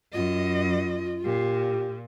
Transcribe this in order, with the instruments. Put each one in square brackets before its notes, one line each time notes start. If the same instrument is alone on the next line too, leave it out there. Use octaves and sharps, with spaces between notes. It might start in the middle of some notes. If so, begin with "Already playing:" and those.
[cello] F#2 D#5 [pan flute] F4
[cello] A#2 [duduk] G4